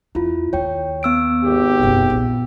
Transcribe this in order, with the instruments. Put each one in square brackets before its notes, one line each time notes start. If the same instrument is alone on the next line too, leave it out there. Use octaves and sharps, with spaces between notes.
[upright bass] E2 [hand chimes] E4 F4
[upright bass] D#2 [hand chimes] C#5 G5
[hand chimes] B3 E6 D7
[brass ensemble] G#1 G4
[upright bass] F#1 B1
A#1